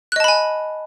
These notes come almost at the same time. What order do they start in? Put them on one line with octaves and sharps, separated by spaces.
F#6 D#5 A5 B5 G#5